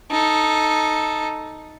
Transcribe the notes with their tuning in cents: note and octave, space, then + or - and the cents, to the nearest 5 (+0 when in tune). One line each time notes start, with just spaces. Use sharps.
D#4 +0 A4 +0